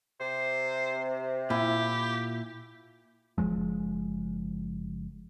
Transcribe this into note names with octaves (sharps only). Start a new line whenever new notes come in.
C3 C5
A#2 E4 G4
F#1 F#2 F3 G#3